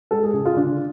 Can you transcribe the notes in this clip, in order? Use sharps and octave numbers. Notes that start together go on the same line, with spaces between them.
G#3 A4
G#4
C#3 G#4
F4
D3 D4